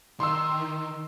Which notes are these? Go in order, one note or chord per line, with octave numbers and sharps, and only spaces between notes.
D#3 C6 E6